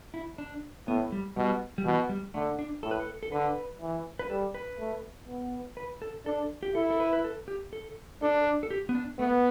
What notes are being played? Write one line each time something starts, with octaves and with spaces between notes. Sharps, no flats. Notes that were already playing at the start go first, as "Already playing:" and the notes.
E4
D4
A2 B3
G3
B2 G3
G3
B2 E3
G3
D3 A3
D4
A2 A4
B4
A4
A4
D3 B4
E3
B4
G3 A4
B4
A3
B3
B4
A4
D4 A4
G4
E4 A4
A4
B4
B4
A4
G4
A4
D4 A4
A4
G4
B3
D4
A3 B3